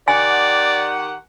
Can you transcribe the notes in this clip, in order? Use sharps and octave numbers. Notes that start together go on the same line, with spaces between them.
D#3 G4 D5 F#5 G#5